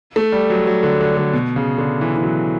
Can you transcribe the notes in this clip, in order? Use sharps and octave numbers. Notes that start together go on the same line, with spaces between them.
A3
G3
F#3
F#3
D3
D3
D3
B2
C#3
D3
E3
E3
F#3